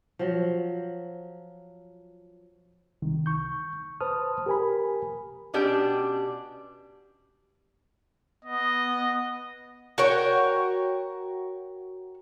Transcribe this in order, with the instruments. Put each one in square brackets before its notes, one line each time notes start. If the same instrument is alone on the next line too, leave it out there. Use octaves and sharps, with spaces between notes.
[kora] F3 F#3
[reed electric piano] C2 D#3
C#6 G6
B4 C5 A5 D#6 F6
G4 A#4 G#5 B5
[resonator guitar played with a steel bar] B2 C#4 D4 G4 G5
[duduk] B3 [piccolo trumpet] D#5
[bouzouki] F#4 A#4 C#5 G5